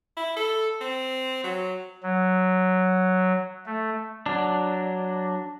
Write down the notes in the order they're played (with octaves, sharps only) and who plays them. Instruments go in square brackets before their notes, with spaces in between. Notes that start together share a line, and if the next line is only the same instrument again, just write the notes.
[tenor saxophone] E4
A4
C4
F#3
[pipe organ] F#3
A3
[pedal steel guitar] F#3 D4